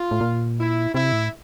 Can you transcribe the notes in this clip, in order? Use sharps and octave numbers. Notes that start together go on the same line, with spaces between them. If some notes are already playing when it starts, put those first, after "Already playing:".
Already playing: F4
A2
A#2
E4
C3 E4
A2